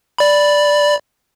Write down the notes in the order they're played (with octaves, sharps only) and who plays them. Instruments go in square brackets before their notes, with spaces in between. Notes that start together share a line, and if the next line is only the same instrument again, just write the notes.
[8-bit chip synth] D5 B5